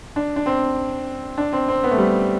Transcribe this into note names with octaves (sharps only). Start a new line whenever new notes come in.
D4
D4
C4
D4
C4
C4
B3
A3
G3